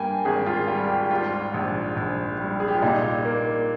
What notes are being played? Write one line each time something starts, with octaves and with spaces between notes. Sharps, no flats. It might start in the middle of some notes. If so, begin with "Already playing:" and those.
Already playing: G2 A#3 G5 G#5
G#1 G#4
F4
G3 F4
G4
G#2 F4
A#1
A#1
G3
G#4
G4
F4
A#2 D#4
A#3